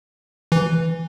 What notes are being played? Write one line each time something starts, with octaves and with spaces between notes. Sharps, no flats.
E3